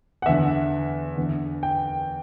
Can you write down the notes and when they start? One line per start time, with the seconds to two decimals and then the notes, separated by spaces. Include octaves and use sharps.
0.22 F#5
0.26 E2 D3 E5
1.17 E2 D3
1.63 G5